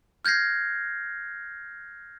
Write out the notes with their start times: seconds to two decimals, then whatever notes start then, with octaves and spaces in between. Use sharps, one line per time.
0.25 F6 G6 G#6 A#6 C7